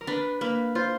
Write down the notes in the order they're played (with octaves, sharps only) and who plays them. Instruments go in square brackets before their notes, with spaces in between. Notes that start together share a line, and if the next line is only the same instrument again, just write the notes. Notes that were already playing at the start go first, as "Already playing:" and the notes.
[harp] A#4
[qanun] D4 [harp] B4
[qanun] A#3 [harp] B4
[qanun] F4 [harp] C5